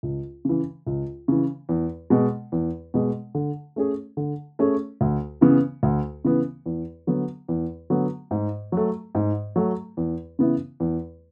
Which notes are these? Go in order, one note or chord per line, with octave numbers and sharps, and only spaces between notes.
C#2
C#3 E3
C#2
C#3 E3
E2
B2 G#3
E2
B2 G#3
D3
A3 C#4 G#4
D3
A3 C#4 G#4
D2
C#3 E3 B3
D2
C#3 E3 B3
E2
D3 F#3 B3
E2
D3 F#3 B3
G#2
F#3 A3
G#2
F#3 A3
E2
C#3 E3 B3 E4
E2